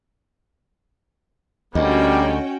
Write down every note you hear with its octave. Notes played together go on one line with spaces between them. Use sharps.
D2 G3 A#3 C#4 F#4 D#5 G5